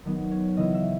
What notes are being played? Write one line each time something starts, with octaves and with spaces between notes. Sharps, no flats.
D#3 F#3 B3 D#4
C#5
C#3 E3 B3 E4 D#5
E5